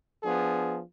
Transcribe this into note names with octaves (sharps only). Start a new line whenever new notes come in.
F3 B3 D4 G#4